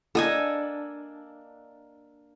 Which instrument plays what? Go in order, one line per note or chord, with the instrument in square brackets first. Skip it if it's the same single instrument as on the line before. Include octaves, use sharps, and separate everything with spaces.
[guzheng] A#3 D4 [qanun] A4 D#5 G#5